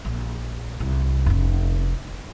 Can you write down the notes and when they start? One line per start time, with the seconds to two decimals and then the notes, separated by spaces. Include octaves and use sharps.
0.05 A#1
0.80 C2
1.26 F1 C#4